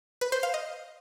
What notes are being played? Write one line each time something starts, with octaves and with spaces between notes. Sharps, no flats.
B4
C5
F5
D#5